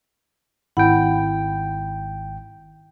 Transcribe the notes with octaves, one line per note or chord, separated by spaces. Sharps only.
G#1 E4 F#5 G5 B5